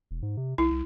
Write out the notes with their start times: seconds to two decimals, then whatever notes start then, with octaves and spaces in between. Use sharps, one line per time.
0.11 E1
0.22 G#2
0.37 C3
0.58 B1 E4
0.71 C2